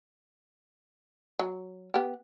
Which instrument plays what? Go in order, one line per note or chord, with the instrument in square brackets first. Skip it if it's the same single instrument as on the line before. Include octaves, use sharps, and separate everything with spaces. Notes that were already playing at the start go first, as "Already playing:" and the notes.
[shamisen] F#3
B3 G4